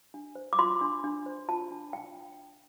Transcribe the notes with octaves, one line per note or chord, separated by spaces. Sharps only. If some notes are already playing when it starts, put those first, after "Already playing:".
D4
C5
D6
F4 C6
D4
D4
C5
F4 A5
D4
D4 G5